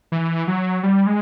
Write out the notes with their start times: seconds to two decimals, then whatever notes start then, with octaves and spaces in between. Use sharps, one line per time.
0.12 E3
0.48 F#3
0.83 G3
1.07 G#3